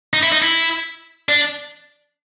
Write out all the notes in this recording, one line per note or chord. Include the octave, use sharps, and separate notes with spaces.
D#4
E4
D#4
E4
D4